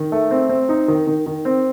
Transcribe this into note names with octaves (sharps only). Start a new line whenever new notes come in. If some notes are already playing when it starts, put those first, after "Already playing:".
Already playing: D#3
A3
C4
C4
D#4
D#3
D#3
D#3
C4